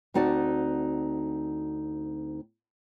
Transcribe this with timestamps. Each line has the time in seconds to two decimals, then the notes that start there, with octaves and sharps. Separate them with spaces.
0.14 D2 C4 D#4 F#4 D5 A5